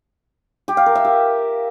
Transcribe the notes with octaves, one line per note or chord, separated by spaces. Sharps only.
G4
F5
A#4
E5
G4